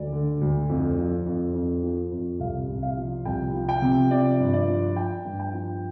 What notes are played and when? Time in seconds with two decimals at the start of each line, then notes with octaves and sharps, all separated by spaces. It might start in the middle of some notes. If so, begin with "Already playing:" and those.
Already playing: D2 D5
0.12 D3
0.41 D2
0.69 F2
0.97 F3
1.26 F2
1.55 F2
1.83 F3
2.11 F2
2.40 C2 F5
2.69 C2
2.83 F5
2.97 F3
3.25 C2 G5
3.54 F3
3.69 G5
3.82 C3
4.11 F3 D5
4.39 G2
4.54 D5
4.68 F3
4.96 F3 G5
5.25 G2
5.39 G5
5.54 F3